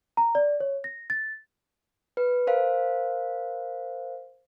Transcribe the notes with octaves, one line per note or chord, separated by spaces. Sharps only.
A#5
D5
C#5
A#6
A6
B4
A#4 C5 F5